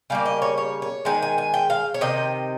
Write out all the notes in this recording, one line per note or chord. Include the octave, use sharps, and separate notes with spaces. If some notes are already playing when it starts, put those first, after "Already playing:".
C#3 G3 A#3 F5
D#5
C#5
C#5
C#5
D#3 G#3 G#5
G#5
G#5
G5
F5
C#5
C3 D#3 D#5